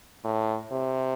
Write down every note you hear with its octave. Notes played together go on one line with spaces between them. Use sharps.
A2
C3